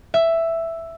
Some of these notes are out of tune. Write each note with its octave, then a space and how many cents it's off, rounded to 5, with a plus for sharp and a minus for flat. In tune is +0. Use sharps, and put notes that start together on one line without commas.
E5 +5